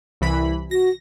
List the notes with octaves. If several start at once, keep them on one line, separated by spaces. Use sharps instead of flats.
C2 E3 B5
F#4 A#6